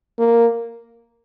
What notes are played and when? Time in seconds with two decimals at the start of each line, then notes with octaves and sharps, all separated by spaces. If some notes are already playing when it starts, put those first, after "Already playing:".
0.19 A#3